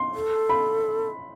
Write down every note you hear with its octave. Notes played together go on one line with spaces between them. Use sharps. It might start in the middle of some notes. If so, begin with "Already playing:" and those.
Already playing: C6
A4
B5